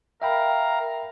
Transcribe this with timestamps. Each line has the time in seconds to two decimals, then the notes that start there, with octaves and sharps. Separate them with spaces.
0.22 A#4 E5 F5 G5 A#5 B5